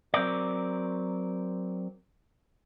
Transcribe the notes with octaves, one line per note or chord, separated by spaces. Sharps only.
F#3 C4 A#4 D5